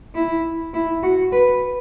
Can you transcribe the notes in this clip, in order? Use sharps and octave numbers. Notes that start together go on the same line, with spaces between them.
E4
E4
F#4
B4